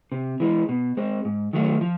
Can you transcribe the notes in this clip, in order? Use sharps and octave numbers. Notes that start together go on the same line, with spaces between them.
C3
E3 G#3
B2
G#3 C4
G#2
D#3 F#3 A3
F3